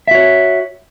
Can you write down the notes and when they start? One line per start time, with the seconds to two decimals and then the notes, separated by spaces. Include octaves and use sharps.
0.08 E5
0.11 F#4
0.15 C#5